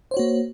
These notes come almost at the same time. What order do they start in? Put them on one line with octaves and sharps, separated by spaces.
C5 C#5 F#4 A#3